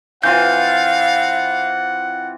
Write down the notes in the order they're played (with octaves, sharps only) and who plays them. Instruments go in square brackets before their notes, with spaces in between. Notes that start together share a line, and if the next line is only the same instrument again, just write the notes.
[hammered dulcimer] E3 C4 F4 [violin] F5 [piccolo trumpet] F#5 [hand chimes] G6